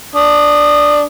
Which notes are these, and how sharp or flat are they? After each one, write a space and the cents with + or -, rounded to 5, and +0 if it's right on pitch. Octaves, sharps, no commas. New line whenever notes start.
D4 +0 D#6 -20